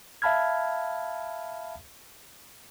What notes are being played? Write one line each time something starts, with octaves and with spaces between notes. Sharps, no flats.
E5 F5 A5 B5 F6 G#6